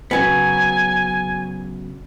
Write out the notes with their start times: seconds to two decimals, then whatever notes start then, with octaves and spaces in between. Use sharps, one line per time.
0.11 C#3 F#3 B3 G#5